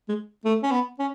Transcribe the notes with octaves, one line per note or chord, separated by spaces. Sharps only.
G#3
A3
C#4
B3
C#4